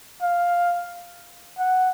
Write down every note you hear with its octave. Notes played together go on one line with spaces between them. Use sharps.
F5
F#5